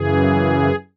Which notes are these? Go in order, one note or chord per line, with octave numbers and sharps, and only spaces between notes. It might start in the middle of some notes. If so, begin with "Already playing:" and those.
Already playing: F#2 C#3 E3 G#4